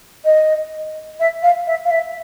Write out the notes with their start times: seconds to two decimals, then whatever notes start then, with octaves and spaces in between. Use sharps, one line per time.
0.25 D#5
1.20 E5
1.42 F5
1.67 E5
1.85 F5
1.91 E5